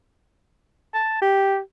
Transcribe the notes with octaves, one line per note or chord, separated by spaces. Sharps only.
A5
G4